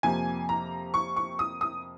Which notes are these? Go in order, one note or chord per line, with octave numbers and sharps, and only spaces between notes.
F2 C3 F3 A#3 G#5
A#5
C#6
C#6
D#6
D#6